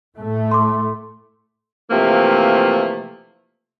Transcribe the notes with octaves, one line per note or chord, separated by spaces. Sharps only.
A2 A3
C6 D6
C3 E3 F3 A3 A#3